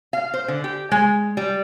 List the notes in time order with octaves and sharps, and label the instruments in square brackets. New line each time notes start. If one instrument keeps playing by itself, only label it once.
[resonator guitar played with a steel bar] F5
C5
D3
G4
G#3
G3